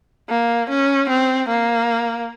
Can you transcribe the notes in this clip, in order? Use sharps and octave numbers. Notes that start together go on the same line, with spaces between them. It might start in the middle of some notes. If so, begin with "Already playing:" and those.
A#3
C#4
C4
A#3